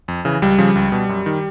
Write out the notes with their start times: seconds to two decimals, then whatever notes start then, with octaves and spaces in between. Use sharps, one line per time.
0.08 F2
0.25 C#3 E3
0.42 C#2 G3
0.58 C#3 F3
0.75 C#2
0.92 B2
1.09 F#2
1.26 D#3